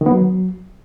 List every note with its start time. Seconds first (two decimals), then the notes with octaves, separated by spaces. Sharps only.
0.01 D#3
0.06 B3
0.11 F#3